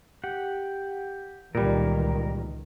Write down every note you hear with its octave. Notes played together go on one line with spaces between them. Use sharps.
G4 F#5
C#2 A#2 D#3 E3 G3 A#4